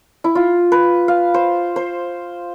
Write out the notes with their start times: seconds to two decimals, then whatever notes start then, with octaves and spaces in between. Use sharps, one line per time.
0.24 E4
0.35 F4
0.72 B4
1.08 F5
1.34 C5
1.76 C5